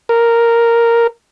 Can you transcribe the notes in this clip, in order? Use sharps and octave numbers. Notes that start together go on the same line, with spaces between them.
A#4